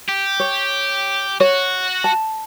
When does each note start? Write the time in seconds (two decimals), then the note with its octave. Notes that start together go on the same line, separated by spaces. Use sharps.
0.09 G4
0.40 C#5
1.40 F#4 C#5
2.04 A5